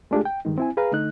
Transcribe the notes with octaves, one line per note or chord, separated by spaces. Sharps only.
G#3 A3 D4 F4 G4 G#4
G5
G2 D#3 G#3 D#4
C4 E4 G#5
G#4 B4 F5 A#5
D3 A3 D#4 F#6